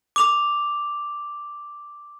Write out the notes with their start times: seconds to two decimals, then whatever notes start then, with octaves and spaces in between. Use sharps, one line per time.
0.16 D6 F7